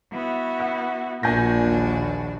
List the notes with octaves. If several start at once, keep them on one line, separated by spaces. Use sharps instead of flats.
B3 E4 F#4
F#5
A#1 A#2 D4 F#4 G#5 G6 A#6
D#2 F#4